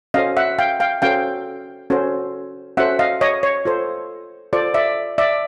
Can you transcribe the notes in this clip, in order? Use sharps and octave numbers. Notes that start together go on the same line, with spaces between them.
C#4 F#4 A4 C5 D#5 F5
E5 F#5
F5 G5
F5 G5
C#4 F#4 A4 C5 F5 G5
C#4 F#4 A4 C5
C#4 F#4 A4 C5 E5 F#5
D#5 F5
C#5 D#5
C#5
F4 A4 C5
F4 A4 C5 D5
D5 E5
D5 E5